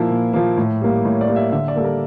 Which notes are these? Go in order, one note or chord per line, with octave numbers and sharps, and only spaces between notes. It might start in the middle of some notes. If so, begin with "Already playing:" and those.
Already playing: A#2 F3 A#3 E4
A#2
F3 A#3
A2
G3 A#3
A2 C#5
D5
G3 A#3
E5
D3 E5
D5
G3 A#3 A4 A#4